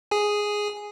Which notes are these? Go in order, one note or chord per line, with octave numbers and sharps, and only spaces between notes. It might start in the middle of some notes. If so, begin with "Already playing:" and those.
G#4 G#5